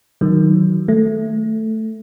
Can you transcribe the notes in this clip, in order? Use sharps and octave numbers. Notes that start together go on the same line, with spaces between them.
D#3 F#3
A3